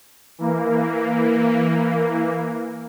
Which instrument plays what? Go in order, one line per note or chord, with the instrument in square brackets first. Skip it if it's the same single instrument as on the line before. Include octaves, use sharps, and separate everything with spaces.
[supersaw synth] E3 A#3